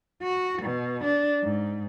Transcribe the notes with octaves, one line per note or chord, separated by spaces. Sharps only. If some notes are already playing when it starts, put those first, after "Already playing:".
F#4
B2
D4
G#2